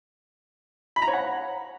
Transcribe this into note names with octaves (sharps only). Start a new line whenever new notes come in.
B5
A#5
C#5
F#5